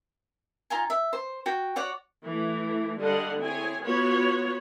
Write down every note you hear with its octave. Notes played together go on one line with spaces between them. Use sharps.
D#4 F4 G#5
E5
C5
F#4 G5
F#4 C#5 D5 F#5
E3 A3
D3 G3 D4 D#5 F5 F#5
C4 E4 G#4 C#5 G#5
B3 F4 F#4 B4 C#5